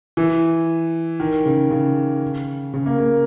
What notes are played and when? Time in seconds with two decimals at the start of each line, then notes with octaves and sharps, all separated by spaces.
0.17 E3
1.20 D#3
1.46 C#3
1.71 C#3
2.74 C#3
2.86 A#3
2.99 A#3